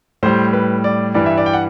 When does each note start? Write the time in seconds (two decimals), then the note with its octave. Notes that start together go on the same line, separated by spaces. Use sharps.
0.23 A2 G3 C5
0.53 B4
0.84 D5
1.14 G2 E3 G3 D5
1.26 E5
1.37 D5
1.46 G5
1.53 F#5